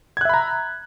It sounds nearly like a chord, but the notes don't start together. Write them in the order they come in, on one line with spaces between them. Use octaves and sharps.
G#6 F#6 E5 B5 A#5